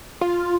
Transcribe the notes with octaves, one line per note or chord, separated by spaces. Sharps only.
F4